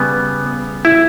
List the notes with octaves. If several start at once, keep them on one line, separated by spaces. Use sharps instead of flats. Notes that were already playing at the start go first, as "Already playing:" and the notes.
Already playing: C#3 G3 B3
E4